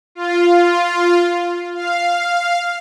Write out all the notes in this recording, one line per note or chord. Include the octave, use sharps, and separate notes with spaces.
F4
F5